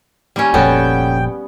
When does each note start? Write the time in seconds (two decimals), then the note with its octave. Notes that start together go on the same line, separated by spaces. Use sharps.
0.36 D#2 G3 C#4
0.54 F1 F2 A#2 B3 C#4 F#4 A4 G5